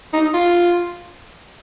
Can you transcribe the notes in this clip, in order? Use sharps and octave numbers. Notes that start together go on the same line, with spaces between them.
D#4
F4